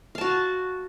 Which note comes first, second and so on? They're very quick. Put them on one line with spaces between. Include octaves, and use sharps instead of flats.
F5 A5 F#4